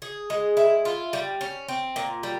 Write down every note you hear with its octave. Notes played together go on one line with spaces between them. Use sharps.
G#4
G#3
E4
F4
G3
C#4
C4
A#2
G3